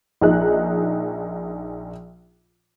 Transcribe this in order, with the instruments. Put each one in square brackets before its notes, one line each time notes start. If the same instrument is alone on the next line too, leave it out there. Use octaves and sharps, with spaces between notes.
[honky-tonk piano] A#1 D#4 G#4 F#6